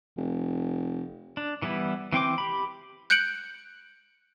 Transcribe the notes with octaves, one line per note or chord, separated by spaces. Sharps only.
F1
D4
E3 G3 B3 E4
E3 C4 G5 D6
G4 B5
F#6 G6 C#7 D7 F#7